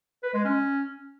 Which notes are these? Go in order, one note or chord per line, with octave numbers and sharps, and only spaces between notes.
B4
G#3
C#4